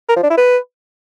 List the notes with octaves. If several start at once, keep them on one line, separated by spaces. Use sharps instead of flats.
A#4
F3
D4
E4
B4